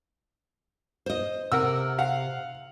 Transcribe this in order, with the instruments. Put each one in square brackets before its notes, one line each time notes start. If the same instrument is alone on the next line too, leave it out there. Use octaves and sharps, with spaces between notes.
[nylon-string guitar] C5 D#5
[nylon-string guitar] C3 [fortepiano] A#4 F#5 E6
[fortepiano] F5 F#5